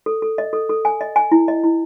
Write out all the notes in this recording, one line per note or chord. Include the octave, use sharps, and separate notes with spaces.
A4
A4
D#5
A4
A4
G#5
D#5
G#5
E4
D#5
E4